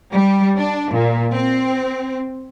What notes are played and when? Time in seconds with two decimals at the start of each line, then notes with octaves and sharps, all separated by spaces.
0.11 G3
0.57 D4
0.93 A#2
1.33 C4